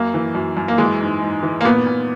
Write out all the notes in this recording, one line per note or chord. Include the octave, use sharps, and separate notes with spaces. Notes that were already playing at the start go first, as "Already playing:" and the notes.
Already playing: F#2 A#3
E3
F#2
F#2
A#3
E3 G#3
G#2
G#2
E3
A#3
A#2 B3
A#2